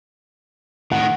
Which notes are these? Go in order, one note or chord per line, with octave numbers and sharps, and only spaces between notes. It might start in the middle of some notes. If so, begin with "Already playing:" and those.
A2 D#3 F#5